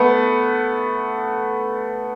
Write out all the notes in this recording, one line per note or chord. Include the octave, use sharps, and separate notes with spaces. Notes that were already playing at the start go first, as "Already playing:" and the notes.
Already playing: A3 B3